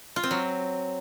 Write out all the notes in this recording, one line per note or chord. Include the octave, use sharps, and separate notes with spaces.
F4
C4
F#3